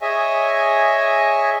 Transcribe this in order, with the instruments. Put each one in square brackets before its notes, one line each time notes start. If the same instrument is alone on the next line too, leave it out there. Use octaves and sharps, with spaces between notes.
[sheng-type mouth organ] G#4 C#5 D#5 E5 G#5